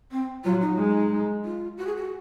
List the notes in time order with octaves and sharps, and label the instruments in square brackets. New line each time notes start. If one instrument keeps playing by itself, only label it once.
[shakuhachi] C4
[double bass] F#3 [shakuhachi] F4
[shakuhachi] D#4
[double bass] G#3
[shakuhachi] F4
F#4
G#4
F#4